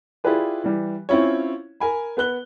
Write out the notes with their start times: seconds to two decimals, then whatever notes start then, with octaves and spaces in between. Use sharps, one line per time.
0.24 E4 F4 G4 G#4 B4 D5
0.64 E3 G3
1.09 C4 C#4 E4 F4 C#5
1.80 A#4 G#5 B5
2.17 B3 B4 F#6 G7